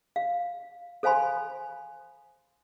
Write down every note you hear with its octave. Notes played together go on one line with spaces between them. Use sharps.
F5
A4 C5 F5 G#5 B5 C6